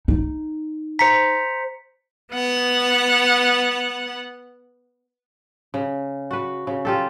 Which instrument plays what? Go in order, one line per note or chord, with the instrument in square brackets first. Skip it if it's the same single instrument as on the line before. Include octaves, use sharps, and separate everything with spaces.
[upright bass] D#4
[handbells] C5 A#5 [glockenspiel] B6 C#7
[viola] B3 F#5
[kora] C#3
F#4 B4
C#3
F4 G4 A4